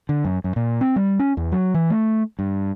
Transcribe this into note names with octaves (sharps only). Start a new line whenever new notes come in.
D3
F#2
F#2
A#2
C4
G3
C#4
E2
F#3
E3
A3
G2